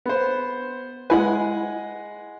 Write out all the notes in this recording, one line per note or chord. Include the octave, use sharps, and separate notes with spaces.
B3 C5
G#3 E4 B4 F#5 G#5